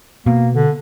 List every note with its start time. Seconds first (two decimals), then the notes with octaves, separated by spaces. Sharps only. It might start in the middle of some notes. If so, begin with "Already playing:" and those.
0.26 B2 A#3
0.54 D3